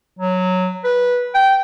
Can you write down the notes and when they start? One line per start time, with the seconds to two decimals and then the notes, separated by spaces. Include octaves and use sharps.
0.19 F#3
0.84 B4
1.35 G5